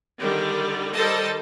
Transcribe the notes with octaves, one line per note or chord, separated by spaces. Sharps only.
D3 D#3 G3
D#3 G3 A4 C5 D#5 A5